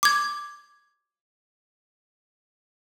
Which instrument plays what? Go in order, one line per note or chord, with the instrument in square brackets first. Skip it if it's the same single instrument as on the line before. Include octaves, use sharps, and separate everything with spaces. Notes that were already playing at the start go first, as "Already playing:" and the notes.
[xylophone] D6 G#6